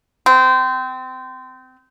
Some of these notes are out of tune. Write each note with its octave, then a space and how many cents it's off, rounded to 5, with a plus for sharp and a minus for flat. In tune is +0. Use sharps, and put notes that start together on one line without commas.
C4 -25